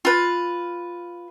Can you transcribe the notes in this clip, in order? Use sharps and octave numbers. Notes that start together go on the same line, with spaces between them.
F4 B4